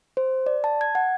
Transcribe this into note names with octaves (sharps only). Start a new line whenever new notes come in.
C5
D5
A5
G#6
F#5